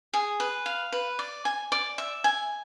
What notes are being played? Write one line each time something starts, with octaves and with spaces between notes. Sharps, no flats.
G#4
B4
F5
B4
D5
G#5
D5
E5
G#5